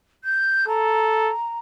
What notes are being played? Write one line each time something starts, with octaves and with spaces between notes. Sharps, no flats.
G6
A4 A#5